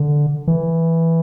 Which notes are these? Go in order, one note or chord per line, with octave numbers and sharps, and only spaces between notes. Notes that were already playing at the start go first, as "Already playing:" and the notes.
Already playing: D3
E3